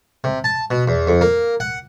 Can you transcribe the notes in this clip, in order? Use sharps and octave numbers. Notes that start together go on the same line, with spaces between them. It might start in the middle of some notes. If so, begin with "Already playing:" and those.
C3
A5
B2
E2
F2
A#3
F#5